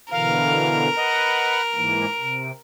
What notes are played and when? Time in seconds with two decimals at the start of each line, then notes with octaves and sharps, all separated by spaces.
0.11 B2 D3 E3 A#4 F5
0.96 B4 D#5 F#5
1.74 G#2 E3 A#3 D7
2.18 C3